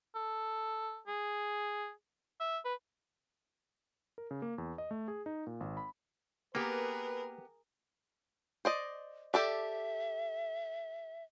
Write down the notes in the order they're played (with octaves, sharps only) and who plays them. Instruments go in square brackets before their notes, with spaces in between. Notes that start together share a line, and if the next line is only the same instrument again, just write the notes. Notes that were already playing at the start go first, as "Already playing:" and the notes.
[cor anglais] A4
G#4
E5
B4
[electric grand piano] A#4
C#3
A#3
E2
D#5
A3
G#4
D#4
A#2
G#1
B5
[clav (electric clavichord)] A#3 [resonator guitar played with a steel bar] B3 G4 [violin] G#4 A#4 [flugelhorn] B4
[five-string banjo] C5 D5 D#5
[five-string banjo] G4 A4 D5 [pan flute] E5